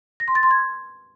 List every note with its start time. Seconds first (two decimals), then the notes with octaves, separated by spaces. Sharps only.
0.20 A#6
0.28 C6
0.35 A6
0.43 C6
0.51 G#6